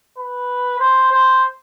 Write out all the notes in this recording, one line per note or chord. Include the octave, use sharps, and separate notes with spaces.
B4
C5
C5